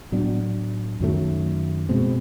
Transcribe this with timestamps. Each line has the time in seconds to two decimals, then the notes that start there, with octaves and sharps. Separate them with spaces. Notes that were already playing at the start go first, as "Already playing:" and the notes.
0.12 A2 F#3 B3 D4
1.00 F#2 D#3 F#3 A3
1.89 B2 G#3 C4